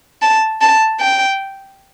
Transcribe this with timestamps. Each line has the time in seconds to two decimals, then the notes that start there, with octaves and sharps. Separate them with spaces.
0.22 A5
0.61 A5
1.00 G5